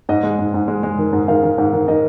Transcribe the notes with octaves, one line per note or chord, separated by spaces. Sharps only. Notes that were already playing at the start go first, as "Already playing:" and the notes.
G#2 D#5
G#3
G#2
G#2
G#3
G#3
D#3
G#2
D#3 F5
D#3
G#2
D#3
D#3 D#5